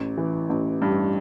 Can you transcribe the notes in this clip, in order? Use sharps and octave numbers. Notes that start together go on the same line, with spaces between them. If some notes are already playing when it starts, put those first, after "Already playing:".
Already playing: A1
E3
A1
G2